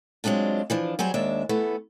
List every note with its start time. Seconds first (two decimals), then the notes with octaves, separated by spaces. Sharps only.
0.24 F#3 G#3 C4 D4 F4
0.70 E3 F3 D4
0.99 F#3 G3 G#4 C5
1.14 D#2 G#3 D4 E5
1.49 E3 A3 B3